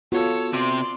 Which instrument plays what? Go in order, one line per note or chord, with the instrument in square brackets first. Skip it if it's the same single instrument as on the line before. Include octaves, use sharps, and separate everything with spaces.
[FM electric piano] B3 F#4 [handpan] F4 [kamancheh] A4 C#5
[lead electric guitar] C3 [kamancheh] D5 C6